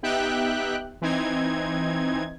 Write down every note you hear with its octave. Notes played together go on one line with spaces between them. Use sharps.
B3 D#4 G4 E5 G5 F#6
E3 C4 D#4 G#6